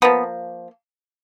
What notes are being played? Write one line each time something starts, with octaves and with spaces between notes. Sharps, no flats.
F3 A#3 B3